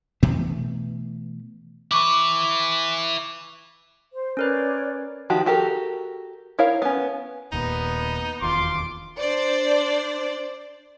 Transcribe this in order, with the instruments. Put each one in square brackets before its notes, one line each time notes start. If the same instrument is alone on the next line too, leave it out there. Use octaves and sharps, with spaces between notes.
[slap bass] B2 E3 A3 B3
[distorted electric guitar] E4 B4 [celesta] C#6 D6
[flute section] C5
[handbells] C#4 A#4 B4 [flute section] C#5 D5
[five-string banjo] D#3 F3 F#4 G4
F#4 G4 A4 A#4
E4 A#4 C#5 F5
B3 C#4
[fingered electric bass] D#1 D#2 A#2 [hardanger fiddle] B3 [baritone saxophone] D#4
[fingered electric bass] E1 D#2 [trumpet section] F4 C6 [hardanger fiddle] D6
[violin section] D4 C5 D5